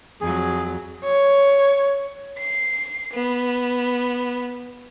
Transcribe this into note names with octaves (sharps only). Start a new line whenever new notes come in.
F2 F#3 G#4
C#5
C7
B3